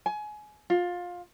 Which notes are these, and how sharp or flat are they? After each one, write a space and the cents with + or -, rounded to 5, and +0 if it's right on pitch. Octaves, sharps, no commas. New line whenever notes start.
G#5 +25
F4 +20